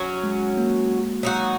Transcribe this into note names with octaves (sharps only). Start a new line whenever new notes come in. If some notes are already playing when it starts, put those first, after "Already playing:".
Already playing: F#3 C#4 F#4
G#3
A#3
F#3 D#4 F#4